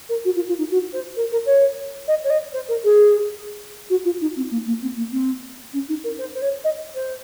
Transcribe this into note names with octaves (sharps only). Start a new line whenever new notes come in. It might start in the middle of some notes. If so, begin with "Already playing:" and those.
A#4
F#4
F4
F4
D#4
F#4
C5
A#4
A#4
C#5
D#5
C#5
D#5
C5
A#4
G#4
F#4
F4
D#4
C4
A#3
A#3
C4
A#3
C4
C#4
D#4
A#4
C5
C5
C#5
D#5
C5